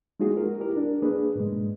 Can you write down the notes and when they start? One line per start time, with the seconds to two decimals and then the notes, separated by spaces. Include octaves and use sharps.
0.20 G#3 A#3 D#4 F4 F#4 G#4
0.37 A#4
0.60 E4 G4 A#4
0.76 D4
1.02 A#3 D4 G#4 B4
1.35 G#2 B2 G#3